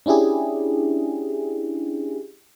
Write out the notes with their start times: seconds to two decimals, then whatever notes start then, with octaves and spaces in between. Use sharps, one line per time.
0.06 C#4 D4 E4 G4 G#4